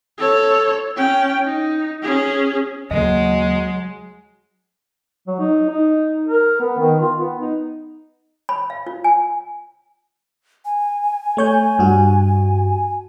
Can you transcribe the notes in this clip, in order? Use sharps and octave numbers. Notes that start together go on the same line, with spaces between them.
A4 C#5
C#4 G5
D#4
C#4 G#4
D#2 C#3 F#3 G#3 A#3 D#5
F#3
D#4
D#4
A#4
B3
D#3
F4
B3
D#4
B5
F5
F4
G#5
G#5
A3 C#5 G6
G2 G3 F#4